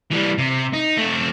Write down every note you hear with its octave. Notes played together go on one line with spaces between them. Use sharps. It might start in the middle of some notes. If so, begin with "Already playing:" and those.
E3 G3
C3
D#4
A3 C4